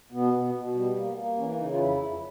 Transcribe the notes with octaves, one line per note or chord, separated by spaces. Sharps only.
B2 B3
B2
B2
G3
A#3
A#3
E3 C#4
C#3 D#4
F4
F2 E4
F2